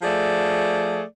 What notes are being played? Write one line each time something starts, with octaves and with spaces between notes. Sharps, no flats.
F3 A3 G#4 D5